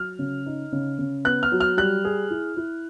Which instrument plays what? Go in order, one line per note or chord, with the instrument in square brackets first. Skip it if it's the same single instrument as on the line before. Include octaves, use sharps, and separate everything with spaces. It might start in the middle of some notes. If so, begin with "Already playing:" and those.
Already playing: [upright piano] F#3 [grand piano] F6
[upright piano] C#3
D#4
C#3
C#3
[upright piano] B3 [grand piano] F#6
[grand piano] F6
[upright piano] F#3
[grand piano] F6
[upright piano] G3 [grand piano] F#6
[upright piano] G#4
E4
E4